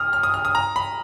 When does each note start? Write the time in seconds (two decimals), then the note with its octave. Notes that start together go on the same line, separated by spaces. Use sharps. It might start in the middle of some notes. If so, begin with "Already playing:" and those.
Already playing: D#6 F6
0.13 F6
0.23 D#6
0.34 F6
0.45 D#6
0.55 A#5
0.76 B5